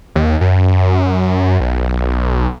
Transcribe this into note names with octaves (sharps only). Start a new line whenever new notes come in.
D#2
F#2
B1